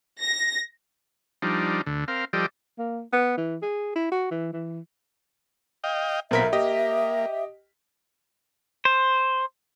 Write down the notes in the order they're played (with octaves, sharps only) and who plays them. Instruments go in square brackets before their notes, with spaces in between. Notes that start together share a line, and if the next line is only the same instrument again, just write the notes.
[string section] A#6
[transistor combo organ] F3 G3 D4 D#4
D2 D3
C4 A#4 F5
F3 G3 G4 A4 D5 D#5
[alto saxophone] A#3
B3
E3
G#4
E4
F#4
E3
E3
[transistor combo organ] D#5 F5 G5
[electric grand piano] B1 A#4 B6 [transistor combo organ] A#2 B3 C4 [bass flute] E5
[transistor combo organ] A#3 [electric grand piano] G4 D#5
[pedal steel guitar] C5